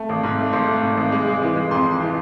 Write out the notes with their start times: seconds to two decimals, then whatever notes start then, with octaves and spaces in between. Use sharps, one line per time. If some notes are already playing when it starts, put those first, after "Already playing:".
Already playing: A3
0.09 G#1
0.23 G#2
0.39 A3
0.52 G#1 C6
0.68 A3
0.82 G#2
0.97 G#1
1.12 G#3
1.27 G#3
1.42 E3
1.56 G#3
1.71 F2 C6
1.85 F2
2.00 E3